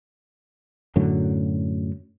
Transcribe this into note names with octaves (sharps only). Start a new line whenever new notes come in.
F#2 A2 D3 F#3